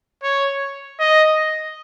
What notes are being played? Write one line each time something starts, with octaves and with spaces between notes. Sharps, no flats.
C#5
D#5